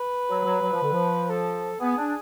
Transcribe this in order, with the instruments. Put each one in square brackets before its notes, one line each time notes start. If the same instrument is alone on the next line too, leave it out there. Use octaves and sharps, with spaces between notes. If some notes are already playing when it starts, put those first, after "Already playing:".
Already playing: [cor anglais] B4
[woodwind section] F#3
F#3
F#3
F3
D3
F3
[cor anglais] A4
[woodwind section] B3 [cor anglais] G#4
[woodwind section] D4